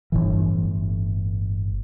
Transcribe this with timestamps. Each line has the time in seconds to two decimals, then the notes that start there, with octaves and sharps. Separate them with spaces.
0.12 G1 A2 E3